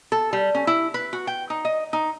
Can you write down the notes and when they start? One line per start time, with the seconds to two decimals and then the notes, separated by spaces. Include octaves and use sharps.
0.12 A4
0.33 G3
0.55 C#4
0.67 E4
0.94 B4
1.13 F#4
1.27 G5
1.50 D#4
1.65 D#5
1.93 D#4